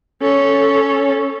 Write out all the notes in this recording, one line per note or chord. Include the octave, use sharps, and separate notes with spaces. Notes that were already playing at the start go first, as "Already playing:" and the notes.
C#4 A4